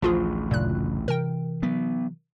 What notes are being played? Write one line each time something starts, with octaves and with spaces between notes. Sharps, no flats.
A1 D2 F3 F4 G#4
F#2 A#2 C#3 F#6
C3 E3 A#4 G5
F#3 B3